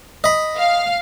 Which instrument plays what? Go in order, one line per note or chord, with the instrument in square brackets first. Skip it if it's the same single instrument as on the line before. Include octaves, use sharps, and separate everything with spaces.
[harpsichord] D#5 B5
[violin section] F5